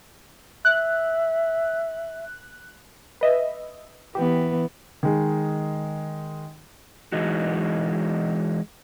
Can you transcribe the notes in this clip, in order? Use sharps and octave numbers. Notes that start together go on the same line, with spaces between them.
E5 F#6
B4 D#5 E5
E3 B3 G4
D#3 G#3
E3 G#3 D#4 F#4